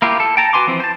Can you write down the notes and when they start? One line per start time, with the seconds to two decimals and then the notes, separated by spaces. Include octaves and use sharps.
0.02 A#3 E4 F4 G4
0.20 A4
0.37 G5 A5 A#5
0.53 F#4 B4 G#5 C6 D6
0.67 E3 F3 C4
0.80 C5 A5